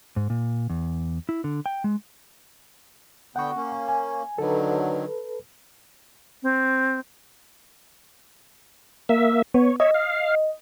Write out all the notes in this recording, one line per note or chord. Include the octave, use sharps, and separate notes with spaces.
G#2
A#2
E2
E4
D3
G5
G#3
D3 B3 F#5 G5 C#6
A#3 C#4
G#5
D3 D#3 F#3 A4 B4
C4
A#3 E5
B3 C#5
C#5 D#5 E5
F5